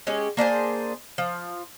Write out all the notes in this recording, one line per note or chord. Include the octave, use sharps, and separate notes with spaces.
G#3 C#4 G4
A#3 D4 G#4 C5
F3